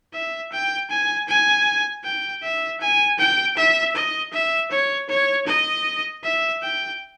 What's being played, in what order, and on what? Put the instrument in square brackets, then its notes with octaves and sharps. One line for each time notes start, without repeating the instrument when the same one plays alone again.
[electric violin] E5
G5
G#5
G#5
G5
E5
G#5
G5
E5
D#5
E5
C#5
C#5
D#5
E5
G5